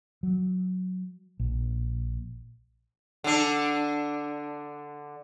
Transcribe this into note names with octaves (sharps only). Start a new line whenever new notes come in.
F#3
A#1
D3 D4